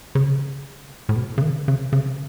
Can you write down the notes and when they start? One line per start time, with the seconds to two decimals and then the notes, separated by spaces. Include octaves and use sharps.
0.15 C#3
1.09 A2
1.16 B2
1.38 C#3
1.42 D#3
1.68 C#3
1.93 C#3